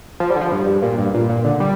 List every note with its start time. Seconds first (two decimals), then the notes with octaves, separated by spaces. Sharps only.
0.20 F3
0.30 G3
0.36 D3
0.41 F3
0.52 G2
0.67 G2
0.83 A#2
0.98 G2
1.14 A#2
1.29 A#2
1.45 D3
1.60 G3